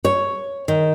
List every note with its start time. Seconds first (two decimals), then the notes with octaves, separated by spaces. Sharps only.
0.05 C#5
0.68 D#3